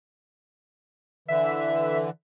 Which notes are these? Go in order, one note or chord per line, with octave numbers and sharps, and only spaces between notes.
D3 E3 E5